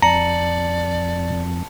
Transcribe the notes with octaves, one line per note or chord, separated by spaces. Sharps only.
F2 D5 A5 A#5 C#7 F#7